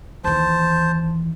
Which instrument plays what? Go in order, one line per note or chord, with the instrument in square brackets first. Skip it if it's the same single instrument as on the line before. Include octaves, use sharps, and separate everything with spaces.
[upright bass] D#2 E3 [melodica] C5 A5